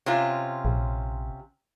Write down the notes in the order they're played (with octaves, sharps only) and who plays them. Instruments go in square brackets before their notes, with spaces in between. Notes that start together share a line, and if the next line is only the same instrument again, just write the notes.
[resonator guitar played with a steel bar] C3 C#4 F4
[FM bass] A#1